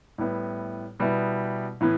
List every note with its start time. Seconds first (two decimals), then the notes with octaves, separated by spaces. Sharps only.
0.18 A2 G3 B3 E4
0.99 B2 G3 B3 E4
1.81 A2 E3 B3